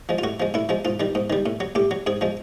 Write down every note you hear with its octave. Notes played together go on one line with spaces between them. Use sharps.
F3 G#3
F4
A2 F#4
F3 G#3
A2 E4
F3 G#3
G#2 F4
D#3 G3
G#2
D#3 G3
A2
F#3
A2 G4
F#3
G#2 G#4
F3 G#3